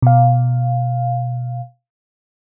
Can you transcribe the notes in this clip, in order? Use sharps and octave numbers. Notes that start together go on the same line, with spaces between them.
B2 F5